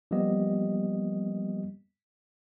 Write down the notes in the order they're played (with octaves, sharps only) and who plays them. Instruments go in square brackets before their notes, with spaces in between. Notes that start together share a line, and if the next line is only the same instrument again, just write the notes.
[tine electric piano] F3 G3 A#3 B3 G4 D#5